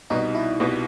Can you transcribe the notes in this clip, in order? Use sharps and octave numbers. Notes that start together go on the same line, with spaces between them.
C2 B2 G3 B3 D#4
E4
C2 B2 G3 B3